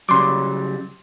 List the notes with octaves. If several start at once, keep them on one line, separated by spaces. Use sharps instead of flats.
C#3 F#3 G3 C6 D6